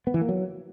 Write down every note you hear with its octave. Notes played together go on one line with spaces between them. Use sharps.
B3
E3
A#3
F#3